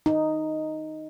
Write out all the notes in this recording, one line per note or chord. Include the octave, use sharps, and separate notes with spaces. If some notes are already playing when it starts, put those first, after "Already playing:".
D#4